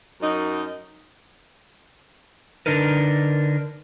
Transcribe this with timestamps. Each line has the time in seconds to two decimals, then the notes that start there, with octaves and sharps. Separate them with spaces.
0.21 F#2 D#4
2.66 D3 D4 D#4 A#4 B4